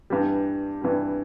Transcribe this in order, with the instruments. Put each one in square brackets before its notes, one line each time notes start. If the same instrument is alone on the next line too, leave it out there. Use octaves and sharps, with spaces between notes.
[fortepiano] G2 E3 G3
G2 E3 G3